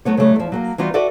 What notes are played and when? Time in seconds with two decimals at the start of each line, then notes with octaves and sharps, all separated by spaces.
0.05 F#3 A3 B3 C#5
0.17 C#3 F#3 G3 A3
0.36 E2 F3
0.52 F#3 A3 A#3
0.78 E3 G3 B3 D#4 F4 F#4
0.94 F#4 A4 B4 D5 E5 F#5